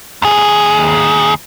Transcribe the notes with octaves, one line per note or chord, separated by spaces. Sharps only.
D#2 G#4